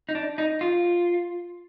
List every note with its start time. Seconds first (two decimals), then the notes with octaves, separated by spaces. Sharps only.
0.09 D#4
0.15 D4
0.38 D#4
0.61 F4